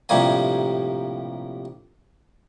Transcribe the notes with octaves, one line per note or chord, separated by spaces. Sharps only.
A#1 A2 C3 G3 A#3 G#5